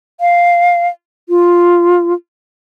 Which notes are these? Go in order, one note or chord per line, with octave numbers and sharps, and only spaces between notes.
F5
F4